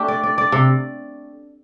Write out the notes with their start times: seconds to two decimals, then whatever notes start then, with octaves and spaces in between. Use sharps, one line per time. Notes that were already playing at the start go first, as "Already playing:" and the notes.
Already playing: A3 D4 G4
0.08 D5
0.23 D5
0.38 D5
0.52 C3